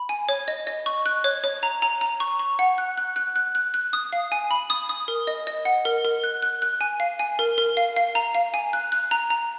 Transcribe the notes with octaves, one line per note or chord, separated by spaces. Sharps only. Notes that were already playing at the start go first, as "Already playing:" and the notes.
Already playing: B5
G#5
C#5
D#5
D#5
C#6
F#6
C#5
C#5
A#5
A#5
A#5
C#6
C#6
F#5
F#6
F#6
F#6
F#6
F#6
F#6
D#6
F5
G#5
B5
D#6
D#6
A#4
D#5
D#5
F#5
A#4
A#4
F#6
F#6
F#6
G#5
F5
G#5
A#4
A#4
F5
F5
A#5
F5
G#5
F#6
F#6
A#5
A#5